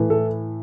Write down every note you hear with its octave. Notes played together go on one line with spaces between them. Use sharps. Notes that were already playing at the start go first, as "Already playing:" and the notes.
Already playing: A2 E3 A3
A4